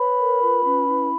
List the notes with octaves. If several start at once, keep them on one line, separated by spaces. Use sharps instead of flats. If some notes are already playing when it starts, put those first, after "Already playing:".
Already playing: B4 C#5 B5
A#4
F4
C#4
E4